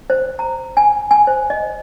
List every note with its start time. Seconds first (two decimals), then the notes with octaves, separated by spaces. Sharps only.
0.10 C5
0.39 A#5
0.77 G#5
1.11 G#5
1.27 C5
1.50 D#5